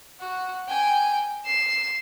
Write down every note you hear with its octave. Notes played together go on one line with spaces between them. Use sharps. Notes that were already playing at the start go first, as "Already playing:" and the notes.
F#4
G5 G#5
C7 E7